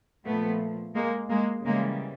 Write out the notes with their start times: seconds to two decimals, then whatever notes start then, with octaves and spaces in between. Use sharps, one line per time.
0.25 A#2 F3 A3 B3
0.95 G#3 A#3
1.30 G#3 A#3
1.65 C#3 E3 G3 G#3 A#3